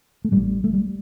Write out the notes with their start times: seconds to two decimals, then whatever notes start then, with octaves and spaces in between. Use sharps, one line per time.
0.25 A3
0.32 A1 A2 G3
0.64 A3
0.74 G3